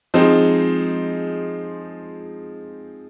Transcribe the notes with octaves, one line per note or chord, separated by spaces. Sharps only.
F3 G#3 C4 D#4